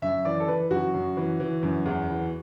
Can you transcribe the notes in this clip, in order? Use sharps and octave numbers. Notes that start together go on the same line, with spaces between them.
F#2 E5
E3 D5
A4
E3 B4
F#2 F#4
F#2
E3
E3
F#2
E2
E3